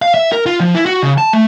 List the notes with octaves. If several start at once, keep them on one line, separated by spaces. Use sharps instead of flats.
F5
E5
A#4
F4
F3
E4
F#4
C#3
A5
A3